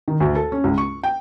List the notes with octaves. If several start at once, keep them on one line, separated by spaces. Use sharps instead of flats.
D#3
D2
A4
C#4
C#2
C#6
G5